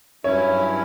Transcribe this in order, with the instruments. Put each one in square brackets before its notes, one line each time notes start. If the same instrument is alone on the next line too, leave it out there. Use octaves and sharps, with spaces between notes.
[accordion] G2 F#3 C#4 E4 [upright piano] C#5